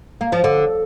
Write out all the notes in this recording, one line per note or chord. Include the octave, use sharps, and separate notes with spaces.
A#3
F3
D3